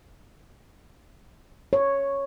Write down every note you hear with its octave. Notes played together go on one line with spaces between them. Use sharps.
C#5